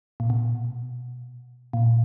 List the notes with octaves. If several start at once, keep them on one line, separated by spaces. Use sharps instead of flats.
A#2
B2
A#2